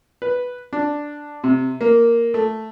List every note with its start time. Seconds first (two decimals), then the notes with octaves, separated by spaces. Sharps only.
0.22 B4
0.73 D4
1.44 C3
1.81 A#3
2.34 A3